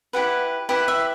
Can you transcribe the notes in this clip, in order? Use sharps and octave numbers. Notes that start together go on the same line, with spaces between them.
E4 G4 B4 F#5
E4 G4 B4 F#5
E5